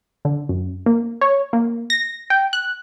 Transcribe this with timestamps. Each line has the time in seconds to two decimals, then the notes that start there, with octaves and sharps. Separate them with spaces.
0.25 D3
0.49 F#2
0.86 A#3
1.21 C#5
1.53 A#3
1.90 A#6
2.30 G5
2.53 F#6